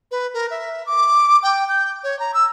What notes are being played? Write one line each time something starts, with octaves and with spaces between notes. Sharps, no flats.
B4
A#4
E5
D6
G5
G6
C#5
A#5
E6